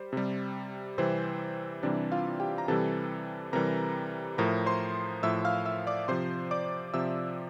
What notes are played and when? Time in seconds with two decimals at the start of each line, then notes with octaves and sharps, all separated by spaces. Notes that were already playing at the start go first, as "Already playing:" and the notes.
Already playing: G3 C5
0.13 C3 G3
0.98 C3 E3 G3 C4 C5
1.83 C3 E3 G3 D4 D5
2.12 F4 F5
2.40 G4 G5
2.58 A#5
2.68 C3 E3 G3 A4 A5
3.53 C3 E3 G3 A#4 A#5
4.38 A2 F3 A#4 A#5
4.66 C5 C6
5.23 A2 F3 E5 E6
5.45 F5 F6
5.65 E5 E6
5.87 D5 D6
6.08 C3 F3 C5 C6
6.51 D5 D6
6.94 C3 F3 E5 E6